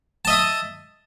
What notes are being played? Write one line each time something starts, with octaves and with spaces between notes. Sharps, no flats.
D#5 E5 A5 D#6